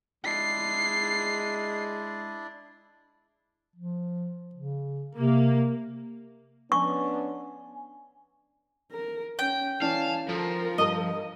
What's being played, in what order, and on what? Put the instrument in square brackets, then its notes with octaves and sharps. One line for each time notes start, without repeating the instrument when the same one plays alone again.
[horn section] G#3 [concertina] D4 E4 D5 [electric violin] C7
[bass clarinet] F3
C#3
[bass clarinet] C3 [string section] A#3
[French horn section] B3 C#4 D4 [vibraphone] G#5 [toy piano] C#6
[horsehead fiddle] A#4
[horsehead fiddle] C#4 [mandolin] G5
[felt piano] E3 C#4 D5 [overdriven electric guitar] F5 [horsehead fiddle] G#5 A5
[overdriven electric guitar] F3 [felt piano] A4 [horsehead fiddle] A#4
[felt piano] G2 D#6 [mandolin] D#5